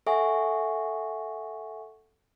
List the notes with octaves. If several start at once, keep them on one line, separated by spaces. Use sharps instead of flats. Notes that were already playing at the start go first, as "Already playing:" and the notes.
A4 E5 F#5 G#5 C#6